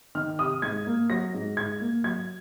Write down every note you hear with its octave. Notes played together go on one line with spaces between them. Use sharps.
D#3 F6
C3 D#6
G#2 G#6
A#3
F#3 A#6
G#2
G#2 G#6
A#3
F#3 G#6